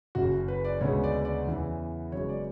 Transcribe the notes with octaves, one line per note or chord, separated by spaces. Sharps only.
F#1 F#2 C#3 F#4
B4
D5
D2 C#3 G#3 B3 C#5
D5
D5
E2 C#3 E3 B3
F#1 F#2 C#3 G#3 B3 C#5
D5